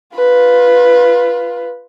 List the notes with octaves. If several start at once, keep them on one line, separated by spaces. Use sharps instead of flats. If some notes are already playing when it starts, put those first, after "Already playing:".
F4 B4